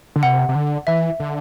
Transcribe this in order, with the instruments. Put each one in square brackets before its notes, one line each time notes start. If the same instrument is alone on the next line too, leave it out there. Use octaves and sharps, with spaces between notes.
[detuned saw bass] D3
[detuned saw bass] C3 [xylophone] F#5
[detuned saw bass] C3
D3
[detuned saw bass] E3 [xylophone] E5
[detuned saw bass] D3